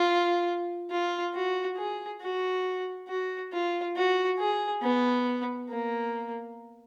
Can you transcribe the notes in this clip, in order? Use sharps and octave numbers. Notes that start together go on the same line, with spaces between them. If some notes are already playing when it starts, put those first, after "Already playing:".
Already playing: F4
F4
F#4
G#4
F#4
F#4
F4
F#4
G#4
B3
A#3